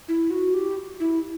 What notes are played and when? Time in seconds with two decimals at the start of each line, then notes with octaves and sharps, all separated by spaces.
0.08 E4
0.31 F#4
0.54 G4
1.00 E4